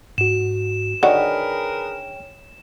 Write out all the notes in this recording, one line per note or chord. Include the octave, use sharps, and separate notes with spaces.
G#2 F#4 E7
D3 D#3 F#4 G#4 A#4 B4 C#5 G5